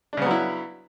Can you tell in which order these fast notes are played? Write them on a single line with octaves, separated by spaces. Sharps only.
D4 C#3 B3 F#3 E4